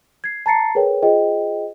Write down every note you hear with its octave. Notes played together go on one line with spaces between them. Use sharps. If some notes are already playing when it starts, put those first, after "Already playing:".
G#6 C7
A5 A#5 A6 C7 C#7
G#4 A#4 B4 C#5 G5
F4 G#4 C5 D#5 G5